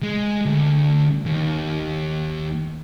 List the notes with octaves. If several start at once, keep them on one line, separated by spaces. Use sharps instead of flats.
G#3
D2
D#2